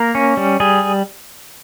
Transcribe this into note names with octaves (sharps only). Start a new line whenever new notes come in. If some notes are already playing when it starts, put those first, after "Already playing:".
Already playing: A#3 A#4
C#4
G3
G3 G#4